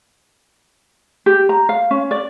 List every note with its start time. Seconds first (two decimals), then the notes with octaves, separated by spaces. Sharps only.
1.26 G4
1.49 A#5
1.69 F5
1.91 C#4
2.11 D5